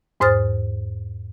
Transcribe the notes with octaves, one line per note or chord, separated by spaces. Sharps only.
E2 G#2 C5 D#6 F6 A6